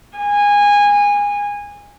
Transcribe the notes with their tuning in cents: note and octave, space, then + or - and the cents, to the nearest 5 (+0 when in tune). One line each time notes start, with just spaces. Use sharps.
G#5 -20